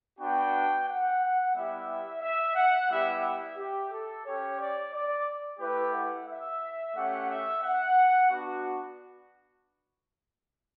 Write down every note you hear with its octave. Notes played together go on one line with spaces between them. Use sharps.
B3 D4 F#4 G5
F#5
G3 B3 E4 G4 E5
E5
F#5
G3 B3 E4 G4 E5
E5
G4
A4
C#4 G4 C#5
D5
D5
A3 E4 G4 B4
F#5
E5
A3 C#4 G4 F#5
E5
F#5
B3 D4 F#4